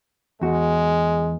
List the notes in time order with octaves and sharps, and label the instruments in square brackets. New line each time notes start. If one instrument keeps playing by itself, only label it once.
[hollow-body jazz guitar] E2 F#4 [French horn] G#3